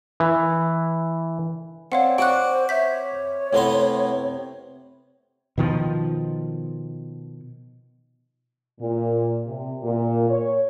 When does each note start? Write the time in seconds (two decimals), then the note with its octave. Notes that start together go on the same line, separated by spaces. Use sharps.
0.20 E3
1.92 C4 C#5 D5 F5 F#5
2.18 F#4 C#6 D6 F#6 D7
2.49 C5
2.69 C#5 E5 G6 B6
3.53 A2 C3 B3 C6
5.58 B2 D#3 F3
8.79 A#2
9.46 C3
9.82 A#2
10.29 C#5